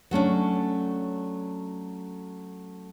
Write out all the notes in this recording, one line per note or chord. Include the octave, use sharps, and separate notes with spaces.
F#3 A3 C#4 D4